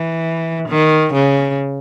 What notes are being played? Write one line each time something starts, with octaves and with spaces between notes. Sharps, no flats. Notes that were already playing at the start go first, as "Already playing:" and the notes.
Already playing: E3
D#3
C#3